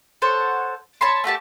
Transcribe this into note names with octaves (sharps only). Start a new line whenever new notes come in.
A4 C5 C#5 F#5
C#5 A5 B5 C6
A3 F#4 G4 A5